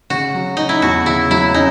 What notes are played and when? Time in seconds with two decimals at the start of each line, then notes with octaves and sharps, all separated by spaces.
0.10 C#3 F#4
0.35 F#3
0.57 C#4 D#4
0.69 E4
0.82 E2 F#4
1.06 C#3 E4
1.31 F#3 E4
1.54 C#4 D#4